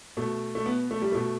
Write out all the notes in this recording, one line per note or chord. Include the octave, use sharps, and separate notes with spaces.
B2 A3
A3
B3
A3
G3
B2 A3